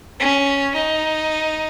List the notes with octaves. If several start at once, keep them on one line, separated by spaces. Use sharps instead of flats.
C#4
D#4